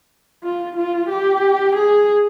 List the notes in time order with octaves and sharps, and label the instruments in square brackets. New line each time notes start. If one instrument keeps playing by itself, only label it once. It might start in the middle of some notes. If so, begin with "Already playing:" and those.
[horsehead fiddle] F4
F4
G4
G#4